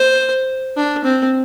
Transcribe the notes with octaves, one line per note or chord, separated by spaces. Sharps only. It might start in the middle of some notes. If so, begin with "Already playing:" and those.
Already playing: C5
D4
C4